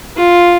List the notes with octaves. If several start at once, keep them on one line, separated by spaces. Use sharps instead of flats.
F4